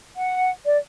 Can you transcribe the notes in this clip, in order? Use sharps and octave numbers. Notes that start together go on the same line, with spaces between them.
F#5
D5